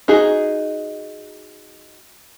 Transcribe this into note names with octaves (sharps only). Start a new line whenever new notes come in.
D#4 F#4 G#4